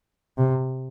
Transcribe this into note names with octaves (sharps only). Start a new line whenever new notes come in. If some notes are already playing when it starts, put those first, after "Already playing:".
C3